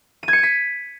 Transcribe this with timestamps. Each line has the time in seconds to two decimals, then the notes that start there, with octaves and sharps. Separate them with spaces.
0.23 D#7
0.28 G#6
0.33 C#7
0.38 D#7
0.43 B6